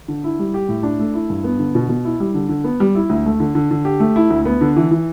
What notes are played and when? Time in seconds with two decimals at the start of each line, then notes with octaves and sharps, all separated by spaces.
0.08 D3
0.24 E4
0.39 G3
0.54 G4
0.69 A2
0.83 D4
0.99 A3
1.14 E4
1.30 G2
1.44 B3
1.59 D3
1.75 B2
1.89 B2
2.05 E4
2.20 G3
2.34 D3
2.49 D3
2.64 B3
2.80 G3
2.95 E4
3.09 D2
3.25 A3
3.40 D3
3.55 D3
3.71 D3
3.85 G4
4.00 A3
4.16 E4
4.30 D2
4.45 B3
4.61 D3
4.76 E3
4.91 E3